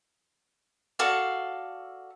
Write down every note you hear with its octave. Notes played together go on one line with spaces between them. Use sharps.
F#4 A4 D5 F5